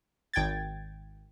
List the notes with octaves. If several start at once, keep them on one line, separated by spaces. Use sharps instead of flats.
G#1 G5 G#6 A6